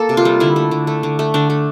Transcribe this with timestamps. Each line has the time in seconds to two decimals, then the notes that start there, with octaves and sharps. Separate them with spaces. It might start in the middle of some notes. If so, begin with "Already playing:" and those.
Already playing: A#3 A4
0.09 C3
0.17 F4
0.25 G3
0.40 D3 E4
0.56 A3
0.71 D3
0.87 A3
1.03 D3
1.19 A3
1.34 D3 D4
1.50 A3